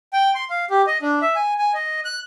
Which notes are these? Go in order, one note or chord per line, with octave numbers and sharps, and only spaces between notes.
G5
C6
F5
G4
D#5
D4
E5
G#5
G#5
D#5
F#6